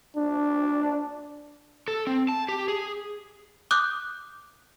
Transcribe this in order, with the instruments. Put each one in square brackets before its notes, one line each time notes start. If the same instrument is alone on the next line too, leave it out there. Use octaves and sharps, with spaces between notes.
[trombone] D4
[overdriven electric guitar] A4
C4
A5
G4
G#4
[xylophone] D6 D#6 F#6 G6